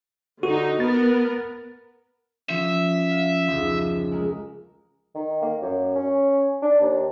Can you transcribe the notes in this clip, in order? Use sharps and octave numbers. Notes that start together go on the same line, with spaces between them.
D3 D#4 F#4
B3 A#4 A6
F3 C#4 E5
F5
F1 C#2 F3
G#3 A#4
D#3
A#3
F#2
C#4
D4
D#2